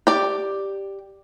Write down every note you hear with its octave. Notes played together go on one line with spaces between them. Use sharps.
G4 D5